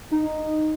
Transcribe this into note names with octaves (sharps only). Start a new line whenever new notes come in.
D#4